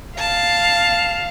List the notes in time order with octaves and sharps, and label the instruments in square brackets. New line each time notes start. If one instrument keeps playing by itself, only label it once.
[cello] F5 [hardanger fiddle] A5